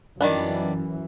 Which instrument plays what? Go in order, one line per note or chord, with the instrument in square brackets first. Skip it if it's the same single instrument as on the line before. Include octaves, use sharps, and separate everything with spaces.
[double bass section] F#2 E3 [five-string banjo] D#3 G3 D4